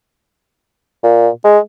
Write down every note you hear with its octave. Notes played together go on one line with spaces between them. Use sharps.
A#2
G#3